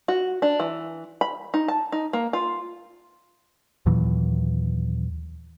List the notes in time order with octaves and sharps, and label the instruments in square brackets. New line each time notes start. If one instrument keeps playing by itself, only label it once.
[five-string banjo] F#4
D4
E3
B5
D#4
A5
D#4
A#3
F4
[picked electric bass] D#2 A#2 E3 F#3